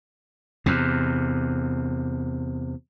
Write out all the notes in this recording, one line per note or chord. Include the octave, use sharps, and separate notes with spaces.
E2 C3